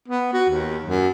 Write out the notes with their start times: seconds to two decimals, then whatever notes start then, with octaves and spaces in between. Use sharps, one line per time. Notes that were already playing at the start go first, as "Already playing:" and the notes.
0.09 B3
0.33 F#4
0.50 D#2
0.85 F#2